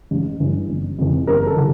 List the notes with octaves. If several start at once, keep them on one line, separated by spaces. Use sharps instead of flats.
A1
G2 E3
G1
F2 C3 E3
G1 A#4
A4
C3 E3